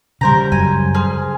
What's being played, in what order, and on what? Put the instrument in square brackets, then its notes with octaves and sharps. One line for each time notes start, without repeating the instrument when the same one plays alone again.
[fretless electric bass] C#3 G3 [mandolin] A#4 C5 A#5
[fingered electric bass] F#2 [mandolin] G#5
[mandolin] G#4 C5 F6